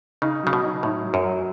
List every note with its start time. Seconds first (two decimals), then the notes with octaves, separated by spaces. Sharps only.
0.22 C#3 D#4
0.43 C#3 F#3
0.53 B2
0.63 D#4
0.83 A2 D#4
1.03 F#3
1.14 F#2
1.24 F#3